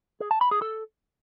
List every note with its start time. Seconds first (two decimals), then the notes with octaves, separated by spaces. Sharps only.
0.20 G#4
0.31 A5
0.41 B5
0.51 G#4
0.62 A4